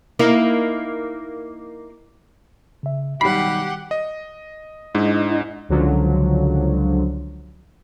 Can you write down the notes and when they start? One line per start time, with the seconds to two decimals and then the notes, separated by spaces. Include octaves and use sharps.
0.19 A#3 D#4 E4
2.83 C#3 E5
3.21 B1 D#3 G3 G4 F#5 B5 C7
3.91 D#5
4.95 G#2 D4 E4 D#5
5.69 C#2 D3 F3 F#3